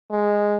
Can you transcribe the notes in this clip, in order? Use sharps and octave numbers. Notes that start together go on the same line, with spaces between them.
G#3